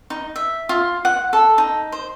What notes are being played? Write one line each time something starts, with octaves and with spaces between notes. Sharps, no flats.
D#4
E5
F4
F#5
A4
D#4
C5